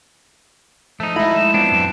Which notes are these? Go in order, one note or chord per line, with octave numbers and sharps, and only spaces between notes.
F3 A3 D#4
G#3 E4 B5 A#6
E7
F3 B3 C4 D4 E7
F#2